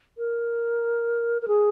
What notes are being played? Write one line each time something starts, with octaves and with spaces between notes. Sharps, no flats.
A#4
A#4
G#4